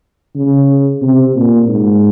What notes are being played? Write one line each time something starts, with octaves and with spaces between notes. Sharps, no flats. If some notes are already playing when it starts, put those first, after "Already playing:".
C#3
C3
A#2
G#2